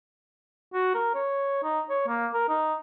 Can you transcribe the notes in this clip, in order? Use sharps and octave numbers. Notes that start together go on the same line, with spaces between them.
F#4
A#4
C#5
D#4
C#5
A#3
A#4
D#4